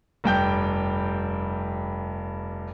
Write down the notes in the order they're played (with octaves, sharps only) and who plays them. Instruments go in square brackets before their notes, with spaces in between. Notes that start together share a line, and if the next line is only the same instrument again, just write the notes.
[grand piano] F1 G2 G5 G6